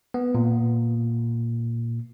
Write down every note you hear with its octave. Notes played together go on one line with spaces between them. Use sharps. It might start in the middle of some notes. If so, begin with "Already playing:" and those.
B3
A#2